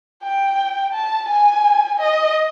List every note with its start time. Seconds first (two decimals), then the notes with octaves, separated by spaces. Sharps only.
0.23 G5
0.94 A5
1.29 G#5
1.99 D#5